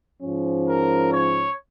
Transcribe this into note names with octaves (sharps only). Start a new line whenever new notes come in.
G#2 F3 C#4
A#4
C#5